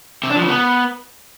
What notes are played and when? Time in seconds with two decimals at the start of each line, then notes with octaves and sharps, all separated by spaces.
0.23 C3
0.30 D4
0.36 F3
0.42 C#3
0.48 B3